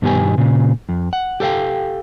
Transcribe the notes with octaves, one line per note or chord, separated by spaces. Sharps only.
G2 B2 D#3 B3 G4 G#5
A#2 C#3
F2
F#5
G4 A4 B4 F5 G5